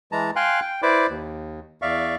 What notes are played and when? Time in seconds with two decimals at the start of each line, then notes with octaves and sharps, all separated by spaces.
0.12 E3 G#3 A5 A#5
0.36 F5 G5 G#5 C6 F#6
0.61 G5
0.82 E4 B4 C5 D5 D6
1.09 D#2
1.82 E2 D5 E5 F5 C#6